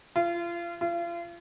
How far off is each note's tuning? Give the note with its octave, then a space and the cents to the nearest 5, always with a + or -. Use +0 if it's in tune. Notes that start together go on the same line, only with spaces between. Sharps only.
F4 -30
F4 -35